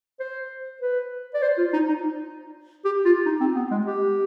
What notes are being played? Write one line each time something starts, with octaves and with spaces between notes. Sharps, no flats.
C5
B4
D5
C5
F4
D#4
D#4
G4
F4
D#4
C4
B3
G#3
G4